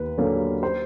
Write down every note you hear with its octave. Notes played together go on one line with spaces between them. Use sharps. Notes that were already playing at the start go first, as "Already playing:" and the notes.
Already playing: D#2 B4
D3 F#3 A#3 C#4
C5